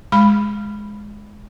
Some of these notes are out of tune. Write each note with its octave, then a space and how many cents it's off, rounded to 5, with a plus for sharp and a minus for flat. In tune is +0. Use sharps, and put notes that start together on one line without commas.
G#3 +0 B5 +0